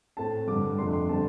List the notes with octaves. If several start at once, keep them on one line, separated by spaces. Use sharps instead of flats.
A2 A3 C4 A5
G2 D3 G3 D6
F2 C3 A3 D4 C6
C6
D3 G3 C4 A5